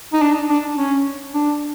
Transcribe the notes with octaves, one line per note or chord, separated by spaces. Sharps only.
D#4
D4
D4
C#4
D4